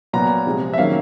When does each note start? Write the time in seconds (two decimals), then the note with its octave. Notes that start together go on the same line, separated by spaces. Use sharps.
0.13 A#2 F#3 B3 A#5
0.46 C3 F3 G#3
0.74 E5
0.78 D#3 F#3 A#3 C#4 F5